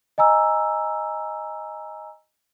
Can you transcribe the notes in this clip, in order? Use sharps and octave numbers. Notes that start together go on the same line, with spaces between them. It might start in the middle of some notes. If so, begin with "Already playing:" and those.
D#5 G#5 A#5 E6